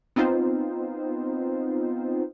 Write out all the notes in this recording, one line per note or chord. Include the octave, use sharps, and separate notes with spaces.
B3 C4 D#4 F4 C5